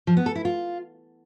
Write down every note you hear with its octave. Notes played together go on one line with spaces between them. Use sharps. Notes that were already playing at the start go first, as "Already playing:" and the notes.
F3
B3
A4
E4
F4